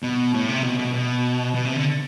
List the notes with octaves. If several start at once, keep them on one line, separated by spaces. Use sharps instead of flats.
B2
A2
C3
B2
B2
B2
B2
C3
D3